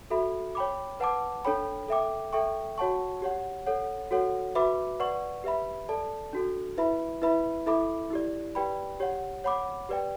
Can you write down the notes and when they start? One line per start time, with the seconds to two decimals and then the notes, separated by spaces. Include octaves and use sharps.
0.10 F#4 A4 E5 B5
0.55 C#5 G5 B5 D6
1.00 B4 F#5 A5 D6
1.45 D4 A4 C#5 G5 B5
1.88 A4 E5 G5 D6
2.33 A4 E5 G5 C#6
2.78 F#4 C#5 F#5 A5 C#6
3.22 G4 C#5 F#5
3.66 A4 C#5 F#5
4.11 F#4 A4 C#5 F#5
4.55 F#4 B4 E5 B5 D6
5.00 B4 D5 F#5 C#6
5.44 G4 B4 E5 B5
5.89 A4 D5 A5
6.33 D4 F#4 A4
6.77 E4 B4 E5 B5
7.22 E4 B4 E5 B5
7.66 E4 A4 E5 B5 D6
8.10 E4 G4 D5
8.55 G4 B4 D5 G5 B5
9.00 G4 C#5 F#5
9.44 C#5 F#5 B5 D6
9.89 G4 B4 D5 G5